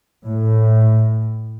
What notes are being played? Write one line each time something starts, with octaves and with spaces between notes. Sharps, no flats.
A2